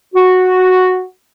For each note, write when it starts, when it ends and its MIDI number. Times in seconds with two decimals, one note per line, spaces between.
0.14 1.03 66